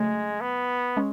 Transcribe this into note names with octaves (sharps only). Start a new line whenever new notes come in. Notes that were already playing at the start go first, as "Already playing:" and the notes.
Already playing: C#3 F#3 G#3 A3
B3
G#3 C#4